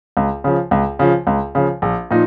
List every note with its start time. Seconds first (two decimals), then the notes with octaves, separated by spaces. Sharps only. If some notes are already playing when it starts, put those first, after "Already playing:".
0.17 C#2
0.44 C#3 F3
0.71 C#2
0.99 C#3 F3
1.27 C#2
1.55 C#3 F3
1.82 A#1
2.11 A#2 F3 D#4